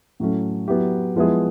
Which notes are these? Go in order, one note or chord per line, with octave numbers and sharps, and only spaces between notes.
A2 F#3 A3 C#4
F#3 B3 E4 G4
F3 G#3 B3 E4 G#4